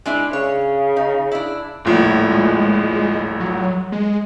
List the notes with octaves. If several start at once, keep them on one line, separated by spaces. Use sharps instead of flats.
G#3 D4 E4
C#3 C#5
D#4
D4 E4
D#1 A#1 A2
G#3
F#3
G#3